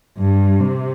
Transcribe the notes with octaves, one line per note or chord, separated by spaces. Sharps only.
G2
C3